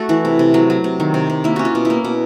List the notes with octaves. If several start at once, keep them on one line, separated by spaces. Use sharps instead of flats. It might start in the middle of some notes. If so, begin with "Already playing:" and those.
Already playing: A3 F#4 A4
E3 E4
C3
C3
F#3
F#3
C3
D#3
C3
C3
A#3 E4
C#4 F#4
F4
B2
E4
A#3
B2